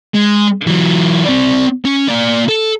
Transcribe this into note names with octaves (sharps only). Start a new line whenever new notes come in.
G#3
E3 F#3
C4 D5
C#4
A#3 D5
A4